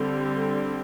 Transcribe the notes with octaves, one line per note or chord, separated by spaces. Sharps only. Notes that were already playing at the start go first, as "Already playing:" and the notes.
Already playing: D3 G3 C4